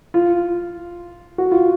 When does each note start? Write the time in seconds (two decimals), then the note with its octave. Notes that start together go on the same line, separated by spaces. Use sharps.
0.14 F4
1.38 F#4
1.52 F4